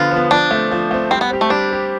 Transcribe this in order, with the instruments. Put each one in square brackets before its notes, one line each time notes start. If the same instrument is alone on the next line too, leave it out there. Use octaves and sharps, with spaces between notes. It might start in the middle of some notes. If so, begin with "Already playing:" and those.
Already playing: [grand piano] D3 F3 B3 [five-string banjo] F4
[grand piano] F3 B3
[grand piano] F3 [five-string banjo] D4
[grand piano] A3 C4
F3
A3 C4
[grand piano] G3 [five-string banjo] C4
[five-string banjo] B3
[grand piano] C4 G4
[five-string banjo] A3
[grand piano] G3 [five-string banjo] D4
[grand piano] C4 G4